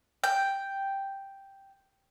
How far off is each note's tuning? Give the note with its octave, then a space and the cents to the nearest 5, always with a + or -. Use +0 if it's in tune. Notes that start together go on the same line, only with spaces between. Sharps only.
G5 +0